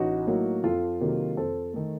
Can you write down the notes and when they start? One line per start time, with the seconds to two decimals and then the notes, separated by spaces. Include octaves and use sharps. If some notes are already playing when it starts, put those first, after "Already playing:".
Already playing: A1 D#4 F#4
0.27 A2 F#3 A#3
0.64 F2 F4 A4
1.00 C3 D#3 F#3 A#3
1.37 F2 A4 C5
1.74 D#3 A3